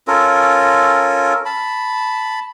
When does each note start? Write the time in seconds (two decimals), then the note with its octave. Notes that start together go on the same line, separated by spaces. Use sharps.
0.08 C#4 F4 A4 A#4
1.46 A5 B5